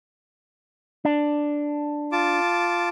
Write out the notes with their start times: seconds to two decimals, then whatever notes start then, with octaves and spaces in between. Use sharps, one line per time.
1.05 D4
2.12 F4 A5 D6